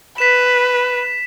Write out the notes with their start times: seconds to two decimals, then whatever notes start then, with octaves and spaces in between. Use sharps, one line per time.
0.18 B4 B6 E7